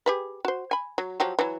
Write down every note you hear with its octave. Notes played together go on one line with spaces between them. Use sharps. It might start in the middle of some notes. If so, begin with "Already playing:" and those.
G4 G#4 B4
F#4 C5
G#5 B5
F#3
F3 F#3 G4
E3 F#3